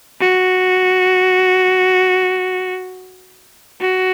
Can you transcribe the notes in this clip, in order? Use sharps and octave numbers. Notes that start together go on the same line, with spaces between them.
F#4
F#4